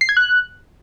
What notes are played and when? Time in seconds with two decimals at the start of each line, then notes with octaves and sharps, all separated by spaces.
0.01 C7
0.09 G#6
0.17 F#6